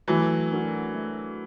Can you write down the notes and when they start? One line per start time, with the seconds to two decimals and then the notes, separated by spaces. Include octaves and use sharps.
0.08 E3 F#3 A3
0.51 D4 F#4 A#4
0.94 A3